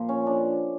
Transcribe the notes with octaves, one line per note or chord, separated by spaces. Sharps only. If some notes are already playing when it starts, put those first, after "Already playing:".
Already playing: A#2 F3
C#4
D4